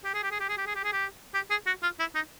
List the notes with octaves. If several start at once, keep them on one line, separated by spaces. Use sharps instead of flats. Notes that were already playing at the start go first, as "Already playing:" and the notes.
G4
G#4
G4
G#4
G4
G#4
G4
G#4
G4
G#4
G4
G4
G#4
F#4
F4
E4
D#4